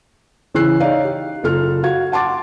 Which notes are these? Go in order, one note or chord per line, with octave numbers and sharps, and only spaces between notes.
C#3 E3 E6 F#6 C7
D#4 C#5 D5 F5
G4
F#1 F4 A4 F6
F#4 F5 G#6
F#5 A5 C6 D6 A6